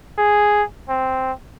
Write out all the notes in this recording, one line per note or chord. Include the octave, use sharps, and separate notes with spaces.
G#4
C4